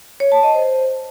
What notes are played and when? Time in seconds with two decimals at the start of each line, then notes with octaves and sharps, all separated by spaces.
0.20 C#5
0.32 A5
0.43 D#5
0.55 C5